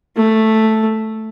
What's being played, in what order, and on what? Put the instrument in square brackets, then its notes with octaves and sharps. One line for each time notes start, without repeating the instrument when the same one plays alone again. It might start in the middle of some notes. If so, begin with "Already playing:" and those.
[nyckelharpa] A3